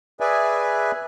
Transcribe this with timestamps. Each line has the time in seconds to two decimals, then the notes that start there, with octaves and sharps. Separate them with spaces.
0.20 G#4 B4 D5 E5 G#5